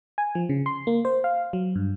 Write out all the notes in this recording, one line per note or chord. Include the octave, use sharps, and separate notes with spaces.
G#5
F3
C#3
C6
A#3
C5
F5
F#3
G2